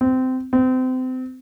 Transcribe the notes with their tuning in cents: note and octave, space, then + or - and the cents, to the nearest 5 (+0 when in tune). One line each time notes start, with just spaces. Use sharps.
C4 -20
C4 -30